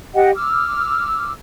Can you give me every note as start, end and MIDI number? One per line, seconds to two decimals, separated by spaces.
0.15 0.30 67
0.15 0.30 75
0.15 0.30 78
0.15 0.30 79
0.35 1.32 86
0.35 1.32 88
0.35 1.32 89